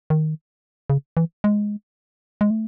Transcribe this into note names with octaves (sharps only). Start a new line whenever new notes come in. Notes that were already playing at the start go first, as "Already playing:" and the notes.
D#3
C#3
E3
G#3
G#3
A3